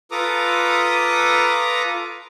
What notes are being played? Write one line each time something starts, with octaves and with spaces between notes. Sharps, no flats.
F4 A4 B4 A#5 D6 D#6